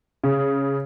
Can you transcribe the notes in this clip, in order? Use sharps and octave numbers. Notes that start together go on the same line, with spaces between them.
C#3